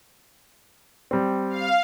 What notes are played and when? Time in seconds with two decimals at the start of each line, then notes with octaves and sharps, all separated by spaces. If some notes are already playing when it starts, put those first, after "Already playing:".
1.11 G3 C4
1.50 F5